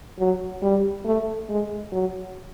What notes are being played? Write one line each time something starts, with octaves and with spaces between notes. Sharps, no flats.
F#3
G3
A3
G#3
F#3